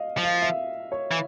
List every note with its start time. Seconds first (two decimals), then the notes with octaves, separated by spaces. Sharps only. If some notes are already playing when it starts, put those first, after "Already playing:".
Already playing: D#5 F5
0.18 F3
0.23 F5
0.42 E5
0.92 C#5
1.11 E3